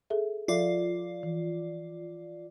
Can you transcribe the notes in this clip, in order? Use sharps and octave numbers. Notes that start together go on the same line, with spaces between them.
G#4 A4 E5
F3 F4 A4 D5 E5
E3